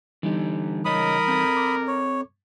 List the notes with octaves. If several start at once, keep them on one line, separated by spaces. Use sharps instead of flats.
D3 E3 G3 D#4 G4
C#3 A#4 C#5 D#5 B5 D#6
C4 A4
D6
C#5